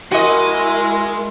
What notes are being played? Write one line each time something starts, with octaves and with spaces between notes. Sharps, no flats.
G#3 E4 F#4 A#4 D#5 G#5 C6